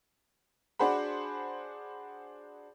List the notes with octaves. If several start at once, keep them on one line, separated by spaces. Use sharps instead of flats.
D4 F#4 G#4 C5 F#5 B5